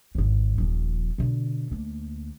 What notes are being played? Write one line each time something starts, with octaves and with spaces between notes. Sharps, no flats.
G#1 E2
D#1 F3
B2 D3
D2 A#3